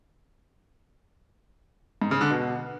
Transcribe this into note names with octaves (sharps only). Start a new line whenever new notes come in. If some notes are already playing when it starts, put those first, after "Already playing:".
G#2
C#3
D3
B2